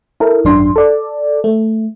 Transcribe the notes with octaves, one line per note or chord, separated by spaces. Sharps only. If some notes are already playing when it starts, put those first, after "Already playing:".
E4 A4 A#4
G#1 F#2 D4 C6
A4 D5
A3